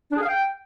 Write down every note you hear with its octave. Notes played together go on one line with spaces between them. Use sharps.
D4
G#4
F5
G5